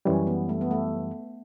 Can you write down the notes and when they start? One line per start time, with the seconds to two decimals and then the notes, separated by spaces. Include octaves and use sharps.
0.05 F#2 E3 G3 C#4
0.27 B3
0.49 A3
0.61 B3
0.71 A3